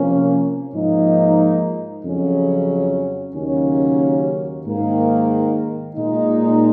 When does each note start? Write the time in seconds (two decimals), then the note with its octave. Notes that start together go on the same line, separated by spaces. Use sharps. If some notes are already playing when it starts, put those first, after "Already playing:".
Already playing: C3 F3 A#3 C#4
0.73 G#2 F3 A#3 D#4
2.03 F2 C#3 F#3 C#4
3.34 D#2 C#3 F#3 A#3 C#4
4.65 G#2 D#3 A#3
5.96 A#2 G#3 D#4